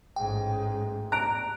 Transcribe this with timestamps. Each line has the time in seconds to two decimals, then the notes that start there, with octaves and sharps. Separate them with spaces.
0.16 A1 G#2 G5
1.12 A#5 F#6 D7